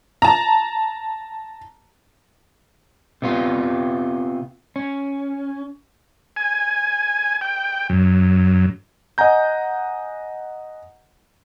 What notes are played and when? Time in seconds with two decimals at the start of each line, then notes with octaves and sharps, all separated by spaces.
0.22 A5 A#5
3.22 C3 B3 F4
4.76 C#4
6.36 G#5
7.41 G5
7.89 F#2
9.18 D#5 F#5 G#5 A#5 G6